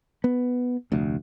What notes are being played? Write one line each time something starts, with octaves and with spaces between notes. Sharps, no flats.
B3
F1 D2